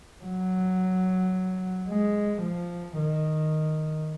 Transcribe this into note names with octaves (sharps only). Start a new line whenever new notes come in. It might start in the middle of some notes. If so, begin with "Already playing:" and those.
F#3
G#3
F3
D#3